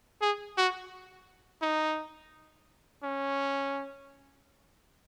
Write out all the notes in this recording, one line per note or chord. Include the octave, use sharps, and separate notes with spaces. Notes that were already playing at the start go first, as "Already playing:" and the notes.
G#4
F#4
D#4
C#4